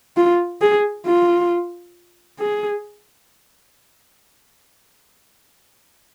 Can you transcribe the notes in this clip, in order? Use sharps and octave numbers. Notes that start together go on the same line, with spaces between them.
F4
G#4
F4
G#4